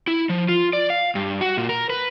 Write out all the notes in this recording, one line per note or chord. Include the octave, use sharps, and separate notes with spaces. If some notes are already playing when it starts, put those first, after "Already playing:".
E4
F3
F4
D5
F5
G2
F#4
A#2
A#4
B4